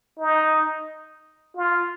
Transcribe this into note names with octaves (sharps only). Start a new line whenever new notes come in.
D#4
F4